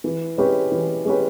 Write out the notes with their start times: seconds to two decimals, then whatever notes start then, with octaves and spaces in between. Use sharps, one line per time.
0.04 E3
0.38 G#3 C#4 G4 B4
0.72 E3
1.05 G#3 C#4 G4 B4